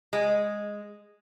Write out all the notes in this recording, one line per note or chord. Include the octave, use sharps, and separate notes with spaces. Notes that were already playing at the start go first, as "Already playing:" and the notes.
G#3